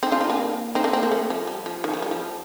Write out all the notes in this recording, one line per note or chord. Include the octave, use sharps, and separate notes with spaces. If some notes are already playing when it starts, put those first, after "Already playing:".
C4 D#4
D4 F4
C4 D#4
A#3 D4
C4 D#4
A#3 D4
C4
A#3
A3
F3
G3
F3
D#3
F3
G3
F3